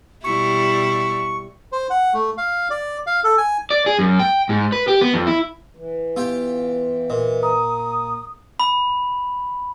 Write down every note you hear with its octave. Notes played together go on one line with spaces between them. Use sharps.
B2 G3 E4 C#6
C5
F#5
A3
F5
D5
F5
A4
G#5
D5
G#4
F#2
G5
G#2
B4
G4
B3
F2
E4
E3
B3 F4 G4 G5
A#2 B4 D#5
A#5 D#6
B5